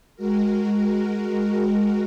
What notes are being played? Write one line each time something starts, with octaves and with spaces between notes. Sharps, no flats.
G#3 F#4 A#4